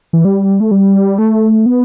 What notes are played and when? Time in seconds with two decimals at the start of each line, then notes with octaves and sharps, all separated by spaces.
0.13 E3
0.25 G3
0.60 A3
0.71 G3
1.19 A3
1.66 B3